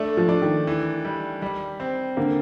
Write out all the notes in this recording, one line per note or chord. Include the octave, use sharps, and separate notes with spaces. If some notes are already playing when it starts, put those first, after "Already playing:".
Already playing: A3 D4
F3
D4
D#3
E3
G3
G3
C4
D3 A#3